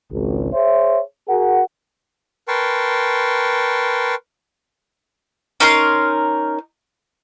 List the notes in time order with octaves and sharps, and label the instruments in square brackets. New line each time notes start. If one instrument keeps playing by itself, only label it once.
[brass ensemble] G#1 C#2
G#4 C5 C#5 E5
F#4 G#4 A#4 F#5
[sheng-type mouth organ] A#4 B4 G5 A5 C6 C#6
[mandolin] C#4 D#4 A#4 C6